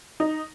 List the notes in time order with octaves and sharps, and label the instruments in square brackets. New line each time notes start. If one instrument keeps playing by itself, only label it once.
[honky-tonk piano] D#4